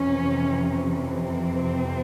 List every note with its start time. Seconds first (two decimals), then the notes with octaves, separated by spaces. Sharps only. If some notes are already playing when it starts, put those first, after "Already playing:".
Already playing: F2 C3 E3 C#4
1.20 C4